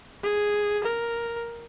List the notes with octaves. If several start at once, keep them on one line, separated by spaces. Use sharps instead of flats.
G#4
A#4